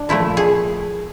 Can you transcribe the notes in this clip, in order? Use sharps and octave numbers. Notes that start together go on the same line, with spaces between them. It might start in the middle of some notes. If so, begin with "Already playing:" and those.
Already playing: D4
A#2 F3 A3 E4
G#4